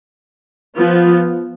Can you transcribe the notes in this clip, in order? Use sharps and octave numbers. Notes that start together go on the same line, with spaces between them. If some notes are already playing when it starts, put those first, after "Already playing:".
F3 B3 F4